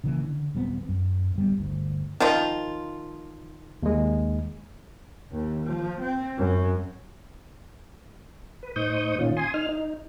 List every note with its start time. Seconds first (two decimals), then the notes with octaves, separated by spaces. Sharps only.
0.04 C#3 E3 A#3
0.24 D3
0.55 D#1 F#3 B3 C4
0.89 F#2
1.36 D1 G3 B3
1.58 G1 D2
2.20 D#3 F3 F4
3.83 D#2 G#3
5.32 D#2
5.66 F3
6.00 C4
6.38 F#2
8.63 B4
8.76 A2 D#4 C5 C#6 D#6 G6
9.19 A#2 D#3 C#4 F4
9.37 G#5 C6 D#6
9.54 D#4 F6
9.69 D#4